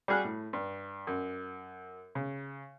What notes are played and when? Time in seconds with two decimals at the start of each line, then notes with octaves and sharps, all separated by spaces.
0.08 G3 F#4 G#4 F6 F#6
0.24 A2
0.53 G2
1.07 F#2
2.15 C#3